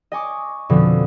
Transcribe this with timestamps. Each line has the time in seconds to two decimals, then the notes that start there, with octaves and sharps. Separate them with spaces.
0.12 D#5 G#5 C#6 D6
0.69 F2 B2 D3 F3 C4